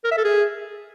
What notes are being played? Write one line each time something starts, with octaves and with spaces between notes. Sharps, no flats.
A#4
E5
A4
G#4